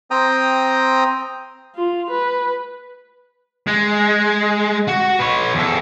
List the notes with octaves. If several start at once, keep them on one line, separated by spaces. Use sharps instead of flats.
C4 G5 A#5 D#6
F4
B4
G#3
F#4
B4 C#5
E2 A4